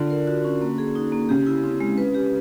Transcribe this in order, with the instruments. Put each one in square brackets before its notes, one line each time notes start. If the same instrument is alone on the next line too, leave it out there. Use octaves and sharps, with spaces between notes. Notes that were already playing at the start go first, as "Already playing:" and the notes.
Already playing: [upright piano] D3 [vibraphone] F4 D5
[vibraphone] A#4
F#4
C#4
A#3
G#4
D#4
A#3
[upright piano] C#3 [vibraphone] G4
[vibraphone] E4
C4
G#3
B4
G4